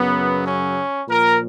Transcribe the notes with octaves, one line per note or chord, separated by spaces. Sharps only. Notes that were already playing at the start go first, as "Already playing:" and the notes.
Already playing: F#2 C#3 F#3 B3
C#4
A#2 F3 A#4